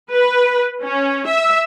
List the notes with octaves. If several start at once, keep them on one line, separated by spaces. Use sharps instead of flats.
B4
C#4
E5